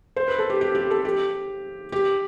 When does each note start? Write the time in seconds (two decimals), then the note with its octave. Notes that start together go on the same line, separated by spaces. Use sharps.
0.16 C5
0.28 B4
0.39 A4
0.50 G4
0.61 G4
0.75 G4
0.90 A4
1.05 G4
1.92 G4